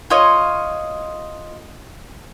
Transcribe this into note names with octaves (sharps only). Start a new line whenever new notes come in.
F4 C#5 D#5